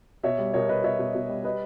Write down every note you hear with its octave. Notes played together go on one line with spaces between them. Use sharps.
B2 C#5 E5
G3
B2 A#4 C#5
B2 B4 D#5
B2 C#5 E5
B2
B2
G3
B4 D#5